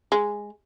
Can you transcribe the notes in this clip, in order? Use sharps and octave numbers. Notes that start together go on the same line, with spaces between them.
G#3